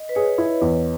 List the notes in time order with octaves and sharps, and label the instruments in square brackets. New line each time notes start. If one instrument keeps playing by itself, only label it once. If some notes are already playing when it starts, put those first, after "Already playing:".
Already playing: [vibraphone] D#5
B4
[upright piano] G#4 [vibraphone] C#5
[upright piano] E4
E2